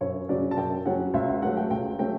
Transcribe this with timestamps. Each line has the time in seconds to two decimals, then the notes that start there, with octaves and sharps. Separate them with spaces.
0.01 F#2 C#5
0.29 C#3 F#3 C#4 D5
0.51 A5
0.57 F#2 G5
0.85 C#3 F#3 C#4 F#5
1.14 C#2 E5
1.28 F#5
1.42 C#3 F#3 A3 C#4 F#5
1.57 G5
1.71 C#2 G5
1.99 C#3 F#3 A3 C#4 G5